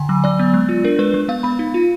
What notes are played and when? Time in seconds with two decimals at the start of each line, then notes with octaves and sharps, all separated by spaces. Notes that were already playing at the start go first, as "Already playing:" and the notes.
Already playing: D3 G#5
0.09 F#3
0.24 F#3 D5
0.39 B3
0.54 G#3
0.69 F4
0.84 D4 A#4
0.99 G#3 B4
1.14 G#3
1.28 B3 F5
1.43 B3 B5
1.59 D#4
1.74 F4